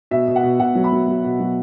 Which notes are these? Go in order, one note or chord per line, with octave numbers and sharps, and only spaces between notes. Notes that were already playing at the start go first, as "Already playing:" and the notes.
B2 E5
B2
F#5
B2
B2 F#5
F#3
B5
F#3
F#3
B2
F#3